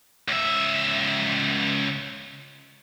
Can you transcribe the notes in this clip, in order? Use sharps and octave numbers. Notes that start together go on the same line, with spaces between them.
C#2 E5